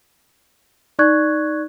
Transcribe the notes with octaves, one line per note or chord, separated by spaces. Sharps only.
D#4 D5 C#6 F#6 G#6